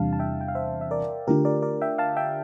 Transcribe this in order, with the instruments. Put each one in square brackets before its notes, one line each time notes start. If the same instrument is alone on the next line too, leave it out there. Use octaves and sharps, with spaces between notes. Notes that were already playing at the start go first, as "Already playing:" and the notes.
Already playing: [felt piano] E2 C3 G3 D4 [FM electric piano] F5 A5
[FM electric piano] A5
E5 G5
G5
F5
C5 E5
E5
A#4 D5
[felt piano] D3 A3 D4 F4 [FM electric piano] G4 A#4
[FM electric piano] A#4 D5
A#4 D5
E5 G5
F5 A5
E5 G5